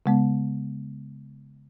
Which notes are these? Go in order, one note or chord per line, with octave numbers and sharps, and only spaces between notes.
C#3 G#3 B3